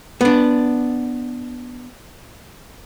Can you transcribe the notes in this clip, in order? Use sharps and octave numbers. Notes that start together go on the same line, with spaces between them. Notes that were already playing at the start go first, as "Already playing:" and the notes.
B3 D4